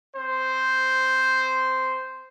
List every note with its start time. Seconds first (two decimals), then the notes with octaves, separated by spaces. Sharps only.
0.16 C4 C5